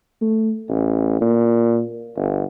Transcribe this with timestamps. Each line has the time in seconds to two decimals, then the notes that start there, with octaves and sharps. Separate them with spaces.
0.22 A3
0.68 A1
1.21 A#2
2.16 G1